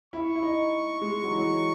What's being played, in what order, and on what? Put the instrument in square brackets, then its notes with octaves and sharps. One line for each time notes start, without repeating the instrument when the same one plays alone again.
[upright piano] E4 [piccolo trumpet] C#6
[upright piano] E4
D#4
G#3
F#3
E3
F#3